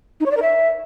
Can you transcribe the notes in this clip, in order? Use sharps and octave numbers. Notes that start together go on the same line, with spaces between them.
D#4
C#5
D5
A#4
E5